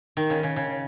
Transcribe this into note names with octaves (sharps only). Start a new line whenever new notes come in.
D#3
C#3
C#3
C#3